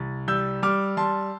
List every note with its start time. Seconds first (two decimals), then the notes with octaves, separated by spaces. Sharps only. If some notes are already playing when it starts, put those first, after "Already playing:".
Already playing: C2 A6
0.28 G3 E6 G6
0.63 G3 D6 F6
0.97 G3 A5 C6